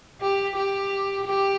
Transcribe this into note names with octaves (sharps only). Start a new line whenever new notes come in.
G4
G4
G4